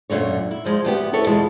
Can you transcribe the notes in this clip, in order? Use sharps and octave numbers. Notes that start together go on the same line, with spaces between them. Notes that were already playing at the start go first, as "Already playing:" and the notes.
F#2 A#2 D3 C#5
E4
D2 F3 G#3
D2 B3 G4
E4 A4 B4 C#5
E2 B2 G#3 F4 A5